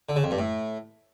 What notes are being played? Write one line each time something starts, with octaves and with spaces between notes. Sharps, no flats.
D3
C#3
F2
G2
A2